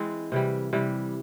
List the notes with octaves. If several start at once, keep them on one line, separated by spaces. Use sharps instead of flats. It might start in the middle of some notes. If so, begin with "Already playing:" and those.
Already playing: E3 G#3 C4
C3 E3 G3
C3 E3 G3